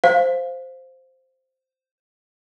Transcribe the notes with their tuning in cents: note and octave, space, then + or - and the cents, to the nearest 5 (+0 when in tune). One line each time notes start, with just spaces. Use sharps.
C5 +0 F5 +0